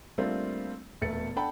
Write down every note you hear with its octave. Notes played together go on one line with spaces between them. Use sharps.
G3 A3 A#3 C4 D4 F4
E1 A#2 A3 B3 A6 C#7
D4 A4 F#5 G5 A5 B5